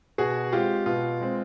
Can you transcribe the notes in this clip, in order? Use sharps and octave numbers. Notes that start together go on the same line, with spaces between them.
B2 F#4 G#4
G#3 C4 F4 G4
B2 F4
G#3 C4